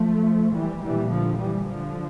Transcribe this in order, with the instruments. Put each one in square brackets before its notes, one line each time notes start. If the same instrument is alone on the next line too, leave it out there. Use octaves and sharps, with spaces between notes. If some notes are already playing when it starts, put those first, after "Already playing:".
Already playing: [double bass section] F3 A3
E3 G3
A#1 A#2 E3 G3
D3 F3
E3 G3
D3 F3